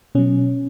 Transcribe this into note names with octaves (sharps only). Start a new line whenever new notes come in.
B2 F#3 C#4